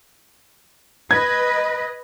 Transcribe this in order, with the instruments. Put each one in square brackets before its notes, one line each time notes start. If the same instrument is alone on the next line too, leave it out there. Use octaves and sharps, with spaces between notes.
[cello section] B4 D#5 [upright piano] G#6